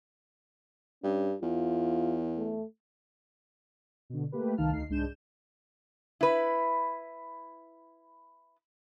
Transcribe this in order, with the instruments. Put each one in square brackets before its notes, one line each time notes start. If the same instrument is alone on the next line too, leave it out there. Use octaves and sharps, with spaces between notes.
[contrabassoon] G2 [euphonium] C#4
[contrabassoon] E2 [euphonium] F4
[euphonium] A3
[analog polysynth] B2 D3
A3 A#3 G4 B4
C2 D#3 D#4 F5 A5 F6
D2 A3 D#4 C7
C2 G#2 G#3 D4 G6 E7
[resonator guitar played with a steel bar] E4 B4